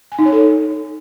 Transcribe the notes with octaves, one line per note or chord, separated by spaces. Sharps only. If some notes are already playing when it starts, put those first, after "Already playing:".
G#5
D#4
C#5
A4